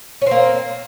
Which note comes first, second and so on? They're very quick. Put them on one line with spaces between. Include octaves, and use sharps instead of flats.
C#4 C4 A#3